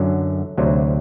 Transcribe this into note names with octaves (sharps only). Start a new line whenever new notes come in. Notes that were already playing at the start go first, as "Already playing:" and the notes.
Already playing: F#2 D3 F#3 A4
D2 C3 F#3